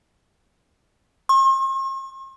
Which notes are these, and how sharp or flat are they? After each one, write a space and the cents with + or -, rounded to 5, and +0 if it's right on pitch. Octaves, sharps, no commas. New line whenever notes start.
C6 +45